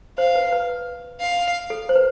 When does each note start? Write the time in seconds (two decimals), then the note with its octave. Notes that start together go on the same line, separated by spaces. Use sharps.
0.18 C5 F5
0.35 B4
0.52 B4
1.20 F5
1.70 A4
1.89 C5
1.96 B4